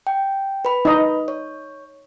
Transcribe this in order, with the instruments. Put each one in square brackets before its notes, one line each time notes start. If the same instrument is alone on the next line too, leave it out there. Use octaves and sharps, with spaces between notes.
[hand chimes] G5
B4 B5
[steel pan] D#4 D#5
[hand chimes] C#5